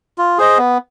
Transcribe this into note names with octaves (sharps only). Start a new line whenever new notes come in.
F4
G#4 C5 D#5
B3